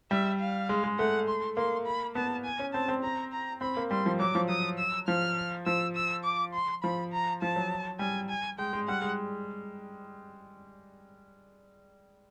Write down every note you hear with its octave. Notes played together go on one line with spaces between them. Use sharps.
G3 E5
F5
G#3
G#3
A3 F#5
C6
A#3 C6
B5
B3 A5
G#5
C#4
C4 A5
C4
A#5
A#5
C4 B5
A#3
G3 C6
F3
F#3 D6
F3
F#3 D#6
E6
F3 F6
F3 E6
E6
D6
C6
F3 B5
A#5
F3 A5
F#3
G3 G#5
G#5
G#3 G5
G#3
G3 F#5
G#3